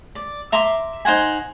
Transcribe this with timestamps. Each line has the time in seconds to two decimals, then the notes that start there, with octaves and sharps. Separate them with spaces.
0.15 D5
0.52 E5 A#5 C6 D6
1.05 D#4 C5 F#5 G#5